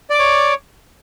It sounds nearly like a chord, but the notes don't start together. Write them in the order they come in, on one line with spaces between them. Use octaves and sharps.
D5 D6 C#5